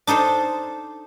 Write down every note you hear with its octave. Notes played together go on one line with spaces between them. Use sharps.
D4 D#4 A4 C5